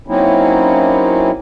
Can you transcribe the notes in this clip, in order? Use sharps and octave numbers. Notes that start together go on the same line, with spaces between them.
F#3 A#3 C4 C#4 D#4 E4